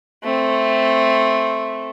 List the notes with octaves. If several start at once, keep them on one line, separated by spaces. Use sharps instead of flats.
A3 C4